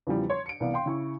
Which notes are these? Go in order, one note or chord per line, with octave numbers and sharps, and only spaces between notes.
E2 C#3 E3 F3 G3
C#5 C6
C#7 D7
C2 E3 B3 D5 F5
F5 G5 C6
C#3 E4 C#6